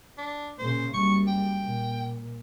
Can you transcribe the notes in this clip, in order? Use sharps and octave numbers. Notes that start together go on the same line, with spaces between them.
D4
A#2 C#3 C5
F#1 G3 C#6
G5
A#2